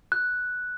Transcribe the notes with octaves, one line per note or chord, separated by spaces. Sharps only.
F#6